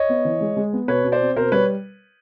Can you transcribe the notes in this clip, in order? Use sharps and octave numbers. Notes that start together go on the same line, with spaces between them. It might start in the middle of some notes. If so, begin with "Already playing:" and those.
Already playing: C#5 D#5
B3
E3
G#3
G#3
B3
B2 B4 C#5
B2
C5 D5
C4
B2 A#4 C5
G3 B4 C#5